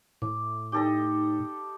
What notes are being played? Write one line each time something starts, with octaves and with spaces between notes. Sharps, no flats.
A2 D6
D#4 G4 A4 D#5